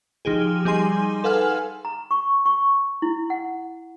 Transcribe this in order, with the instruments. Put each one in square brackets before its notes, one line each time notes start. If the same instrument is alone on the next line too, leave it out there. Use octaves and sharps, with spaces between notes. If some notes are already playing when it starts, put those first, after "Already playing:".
[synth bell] F3 D#4 G4 G#4
G3 D#4 G#4 G#5 C6
A4 B4 F5 F#5 G#5 F6
[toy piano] A#5
C#6
C#6
E4
F#5